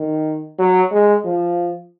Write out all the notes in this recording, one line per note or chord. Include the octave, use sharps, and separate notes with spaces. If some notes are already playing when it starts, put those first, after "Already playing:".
Already playing: D#3
F#3
G#3
F3